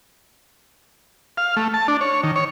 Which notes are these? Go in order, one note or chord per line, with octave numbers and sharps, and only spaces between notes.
F5
A3
A5
D4
C#5
D#3
C#5